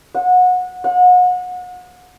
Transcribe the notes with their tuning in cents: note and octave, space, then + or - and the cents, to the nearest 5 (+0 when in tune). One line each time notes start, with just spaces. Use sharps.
F#5 -25
F#5 -35